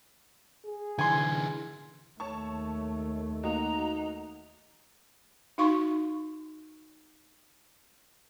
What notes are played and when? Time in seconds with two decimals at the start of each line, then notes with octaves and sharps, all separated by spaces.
0.66 G#4
0.98 D3 E3 G#5 C6
2.20 D#2 A3 C#5 A5 C#6
3.44 A#3 D#4 F#4 D#5 A#5
5.58 D#4 F#4 F5 C6 C#6